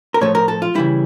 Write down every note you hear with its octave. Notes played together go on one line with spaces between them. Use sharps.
A#4
A2 F3 A3 C#5
A#4
A4
F4
C#3 E3 G3 E4